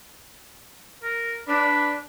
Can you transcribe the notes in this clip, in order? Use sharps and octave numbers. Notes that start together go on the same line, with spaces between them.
A#4
D4 B4